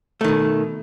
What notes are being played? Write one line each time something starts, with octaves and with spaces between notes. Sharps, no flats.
B2 D#3 A3